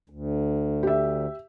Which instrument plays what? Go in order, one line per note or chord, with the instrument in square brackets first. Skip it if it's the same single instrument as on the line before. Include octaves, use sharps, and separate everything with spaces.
[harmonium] D2
[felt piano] G4 E5